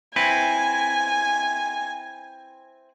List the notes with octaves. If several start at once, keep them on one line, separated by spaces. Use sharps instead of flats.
C4 E4 B4 G#5